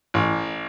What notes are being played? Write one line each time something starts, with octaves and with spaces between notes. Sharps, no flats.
A1